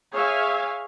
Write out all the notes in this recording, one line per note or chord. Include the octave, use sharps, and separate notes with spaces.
G#4 C#5 E5 F5 G#5